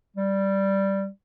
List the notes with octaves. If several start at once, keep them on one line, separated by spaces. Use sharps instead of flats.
G3